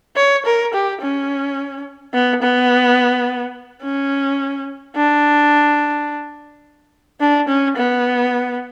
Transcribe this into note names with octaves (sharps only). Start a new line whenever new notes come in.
C#5
A#4
G4
C#4
B3
B3
C#4
D4
D4
C#4
B3